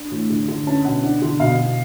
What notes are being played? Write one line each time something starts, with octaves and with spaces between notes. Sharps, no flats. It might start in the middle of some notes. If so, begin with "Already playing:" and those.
Already playing: D4
A2
D3
D3
C#4 A5
B2 F#5
D4
D3
B2 F5
B2